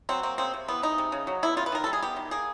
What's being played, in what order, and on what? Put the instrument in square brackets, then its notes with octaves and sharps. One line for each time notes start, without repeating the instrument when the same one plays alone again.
[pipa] F#3 C4
A#3 C4
C#3 C4
C3
E3 B3
G#3 D#4
C3
C#3
F#3
B3 E4
C#3 F4
B4
D#3 A#4
G3 A4
G#4
B3 G4
D#3
A#3 G#4